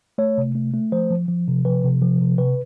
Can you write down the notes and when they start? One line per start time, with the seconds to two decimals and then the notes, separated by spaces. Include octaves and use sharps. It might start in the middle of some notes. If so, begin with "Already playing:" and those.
0.18 A3 C#5
0.38 C3
0.55 A3
0.74 A3
0.92 F3 C5
1.10 F3
1.28 F3
1.48 C3
1.65 F3 B4
1.84 C3
2.01 F3
2.21 C3
2.38 C3 B4